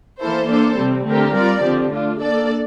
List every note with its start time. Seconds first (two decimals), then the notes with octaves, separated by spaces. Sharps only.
0.20 E3 A#3 E4 A4 C5
0.48 A#3 D4 A4 C5
0.77 C3 G3 C4
1.07 D3 A3 C4 G4 A#4
1.35 G3 C4 F4 A#4 D5
1.63 D3 F3 C4 G4
1.93 A3 D4 F4
2.21 A#3 D4 A4 D5